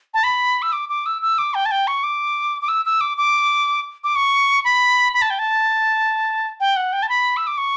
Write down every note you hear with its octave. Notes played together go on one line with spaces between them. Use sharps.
A5
B5
E6
D6
D6
E6
E6
D6
G5
A5
G5
C#6
D6
D6
E6
E6
D6
D6
D6
C#6
B5
B5
A5
G5
A5
G5
F#5
G5
A5
B5
E6
D6
C#6